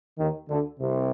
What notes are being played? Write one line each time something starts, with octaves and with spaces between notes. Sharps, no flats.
D#2 D#3
D2 D3
C2 C3